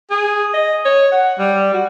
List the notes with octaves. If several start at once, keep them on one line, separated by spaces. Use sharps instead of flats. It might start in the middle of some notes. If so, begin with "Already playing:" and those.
G#4
D#5
C#5
F#5
G3
F#4